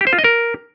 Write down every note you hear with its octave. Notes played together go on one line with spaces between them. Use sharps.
G4
C5
F4
D#5
A#4